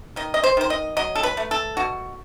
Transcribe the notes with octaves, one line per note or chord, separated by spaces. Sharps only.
D#3 D#5
D#5
C5
D#3 C5
D#5
F#3 D#5
A4
B4
A3
A4
B2 F#4